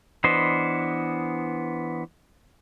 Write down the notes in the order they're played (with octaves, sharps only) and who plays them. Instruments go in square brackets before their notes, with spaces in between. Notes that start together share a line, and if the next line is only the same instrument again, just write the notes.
[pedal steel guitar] E3 B3 D4 C5 D#5